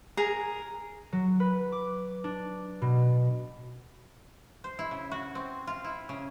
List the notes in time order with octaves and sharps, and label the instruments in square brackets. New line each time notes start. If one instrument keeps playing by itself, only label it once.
[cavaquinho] G#4 A#4 A#5
[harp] F#3
B4
D6
D4
B2
[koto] C5
E4
C#3
F#4
C4
F4
E4
C#3